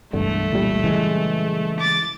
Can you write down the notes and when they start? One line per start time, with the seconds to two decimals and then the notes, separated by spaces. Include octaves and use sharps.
0.13 E1 C2 G2 D3 A3
0.53 A#2 G3
0.84 C#3 E3 G#3
1.80 D6 A6